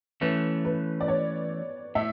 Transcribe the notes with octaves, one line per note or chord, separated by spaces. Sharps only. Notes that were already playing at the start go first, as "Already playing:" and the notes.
E3 A3 C#4 B4
B4
D5
C#5
A2 E5